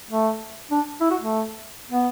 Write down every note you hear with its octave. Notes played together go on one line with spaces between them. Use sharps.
A3
D4
E4
F#4
A3
B3